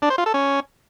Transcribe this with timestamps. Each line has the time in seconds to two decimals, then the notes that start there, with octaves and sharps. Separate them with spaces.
0.02 D4
0.10 C5
0.18 F4
0.26 A4
0.34 C#4